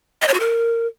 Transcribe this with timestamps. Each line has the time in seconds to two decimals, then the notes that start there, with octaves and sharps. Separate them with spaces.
0.22 D#5
0.28 C#5
0.34 F#4
0.40 A#4